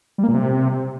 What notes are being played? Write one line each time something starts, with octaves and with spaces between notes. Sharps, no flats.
G3
A#3
A#2
C3